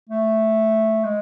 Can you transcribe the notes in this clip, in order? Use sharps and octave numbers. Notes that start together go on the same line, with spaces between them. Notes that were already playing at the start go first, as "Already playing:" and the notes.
A3
G#3